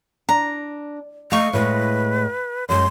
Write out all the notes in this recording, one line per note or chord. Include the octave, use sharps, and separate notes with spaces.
D4 A#5
A3 D#5 F5 C#6
A2 G#3 B4
F#2 G#3 C#4 C6